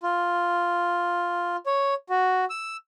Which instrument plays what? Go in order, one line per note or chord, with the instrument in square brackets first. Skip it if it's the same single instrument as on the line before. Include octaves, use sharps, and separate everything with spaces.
[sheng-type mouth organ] F4
C#5
F#4
E6